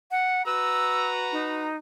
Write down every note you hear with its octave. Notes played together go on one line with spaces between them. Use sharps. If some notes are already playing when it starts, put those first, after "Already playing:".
F#5
F#4 B4 A#5 E6
D#4